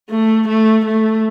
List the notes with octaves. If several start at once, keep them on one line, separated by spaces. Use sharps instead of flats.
A3
A3
A3